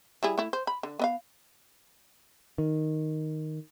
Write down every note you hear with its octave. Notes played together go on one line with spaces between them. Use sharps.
G3 E4 G#4
A3 E4
C5
B5
D3
B3 D#5 F5
D#3